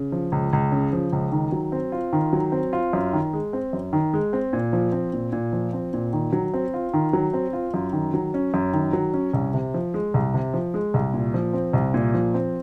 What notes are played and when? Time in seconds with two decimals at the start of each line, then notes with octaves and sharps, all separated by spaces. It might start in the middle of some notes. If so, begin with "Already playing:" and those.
Already playing: C#3
0.12 F3
0.32 C#2
0.53 C#2
0.72 C#3
0.93 F3
1.13 C#2
1.32 D#3
1.52 F#3
1.72 C4
1.92 F4
2.13 D#3
2.33 F#3
2.52 C4
2.73 F4
2.93 F#2
3.13 D#3
3.33 G#3
3.53 C4
3.73 F#2
3.93 D#3
4.13 G#3
4.33 C4
4.53 A#2
4.73 F3
4.92 C4
5.13 A#2
5.33 A#2
5.53 F3
5.73 C4
5.94 A#2
6.13 D#3
6.33 F#3
6.54 C4
6.74 F4
6.93 D#3
7.13 F#3
7.33 C4
7.53 F4
7.74 F#2
7.93 D#3
8.14 F#3
8.34 C#4
8.54 F#2
8.73 D#3
8.93 F#3
9.13 C#4
9.34 C2
9.54 C3
9.74 F3
9.94 G#3
10.14 C2
10.34 C3
10.54 F3
10.74 G#3
10.94 C2
11.14 A#2
11.34 F3
11.53 C4
11.73 C2
11.94 A#2
12.14 F3
12.34 C4